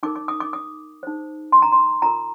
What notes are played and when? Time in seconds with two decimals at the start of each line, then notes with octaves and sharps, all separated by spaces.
0.03 D#4 A#4 D6
0.15 D6
0.28 D#6
0.40 D6
0.53 D#6
1.03 D#4 G#4 C5
1.52 C6
1.62 A#5
1.72 C6
2.02 F4 A#4 A#5